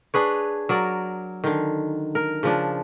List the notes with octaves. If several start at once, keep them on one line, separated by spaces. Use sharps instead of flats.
D4 G#4 B4 C#5
F#3 A#4 D5
D3 D#3
A#4
C#3 F3 D4